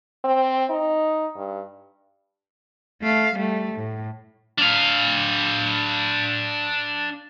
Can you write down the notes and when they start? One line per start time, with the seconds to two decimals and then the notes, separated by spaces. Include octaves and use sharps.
0.24 C4
0.70 D#4
1.36 G2
3.02 A3 F5
3.35 G3 A3
3.75 A2
4.58 D4 F5